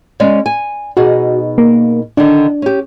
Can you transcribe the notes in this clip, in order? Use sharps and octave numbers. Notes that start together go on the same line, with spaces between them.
G#3 C#4 D5
G#5
B2 D#4 F#4 G#4
A#3
D3 D#3 D4
C#4 G4